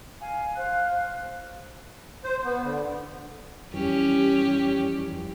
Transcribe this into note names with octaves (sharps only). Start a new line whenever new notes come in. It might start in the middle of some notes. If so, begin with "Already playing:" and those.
F5 G#5
C5 F5 F#6
C5
B3
D3
F2 E3 G3 C#4 G4